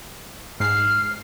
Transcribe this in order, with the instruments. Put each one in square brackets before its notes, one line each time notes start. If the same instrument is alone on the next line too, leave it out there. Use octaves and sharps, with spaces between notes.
[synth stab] G#2 C7 [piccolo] F6